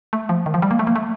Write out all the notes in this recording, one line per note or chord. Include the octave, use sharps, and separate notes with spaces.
A3
F3
D#3
F3
G3
A#3
A3
A#3
A3